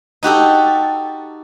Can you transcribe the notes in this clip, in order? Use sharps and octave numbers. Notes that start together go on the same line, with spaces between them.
D#4 F#4 G4 A4